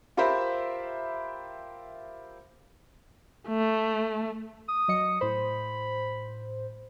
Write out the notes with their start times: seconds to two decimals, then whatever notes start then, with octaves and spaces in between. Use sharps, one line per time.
0.17 F4 G4 A#4 C5 E5 B5
3.48 A3
4.69 D#6
4.88 F#3 D#5 C#7
5.21 A2 C5 B5